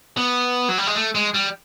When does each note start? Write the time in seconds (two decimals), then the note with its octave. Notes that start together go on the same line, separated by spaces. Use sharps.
0.17 B3
0.69 F#3
0.78 G3
0.87 G#3
0.95 A3
1.15 G#3
1.34 G3